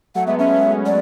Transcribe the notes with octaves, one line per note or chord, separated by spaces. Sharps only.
F#3 A3 F#5
G#3 B3 E5
A3 C#4 E5
A3 C#4
D5